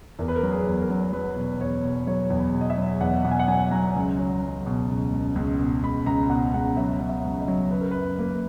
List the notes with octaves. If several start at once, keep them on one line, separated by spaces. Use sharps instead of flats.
E2 A#4
B4
A#4
F#3
G#4
E2
A#4
F#3
F#3 B4
B2
E2 C#5
B2
F#3 C#5
E2
B5
B2
D#5
E5
F#3
E2 F#5
B2 F#5
G#5
F#5
F#3 G#5
F#3 A#5
C#2
F#3
F#3
B2
C#2
C#2
C#2
B2
C#2 B5
C#2 A#5
B2 F#5
C#2 F#5
F#3 E5
F#3
E5
C#2
D#5
F#3
C#3 B4
A#4
F#2 B4
A#3